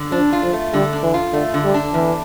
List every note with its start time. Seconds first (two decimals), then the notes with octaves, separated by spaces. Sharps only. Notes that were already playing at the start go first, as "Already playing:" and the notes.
Already playing: D3
0.11 F3 D4
0.33 F4
0.43 F3
0.53 A3
0.73 D3 G3
0.93 D4
1.03 E3
1.14 F4
1.33 D3 A3
1.54 D3
1.64 G3
1.74 D4
1.94 E2 E3